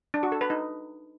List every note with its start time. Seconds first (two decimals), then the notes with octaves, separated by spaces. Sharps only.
0.14 D4
0.23 F#4
0.32 A4
0.41 B4
0.50 D#4